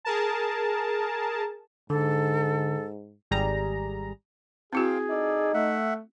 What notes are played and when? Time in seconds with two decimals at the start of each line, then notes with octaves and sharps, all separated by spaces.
0.05 G#4 A#4 A5
1.90 G#2 D3 A4
3.31 G#1 G3 G#4 A#5
4.73 C4 E4 F#4 G#4 C5 F5 G5
5.10 D#4 A4 D5
5.54 A3 E5 F#5